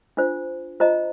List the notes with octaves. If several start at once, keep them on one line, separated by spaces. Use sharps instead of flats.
D4 F4 C5
F4 C5 D#5 A#5